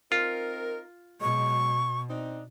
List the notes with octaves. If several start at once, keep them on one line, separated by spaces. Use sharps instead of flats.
C4 D#4 F4 A#4
B2 F#3 G#3 C#6
C4 D4 D#4